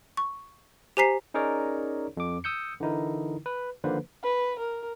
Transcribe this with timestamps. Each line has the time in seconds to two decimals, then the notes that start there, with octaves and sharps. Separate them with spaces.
0.17 C#6
0.97 G4 C5 G#5 A#5 B6 C7
1.34 C#4 D#4 G#4 A#4 C#5 D5
2.17 F2 D6
2.44 D#6 E6 G6 C#7
2.80 D3 E3 D#4 E4 A#4
3.46 B4
3.84 D3 D#3 F3 A#3 B4 C5
4.24 B4
4.59 A#4